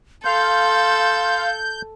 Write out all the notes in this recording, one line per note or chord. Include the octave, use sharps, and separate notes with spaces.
A4 F5 C6 G6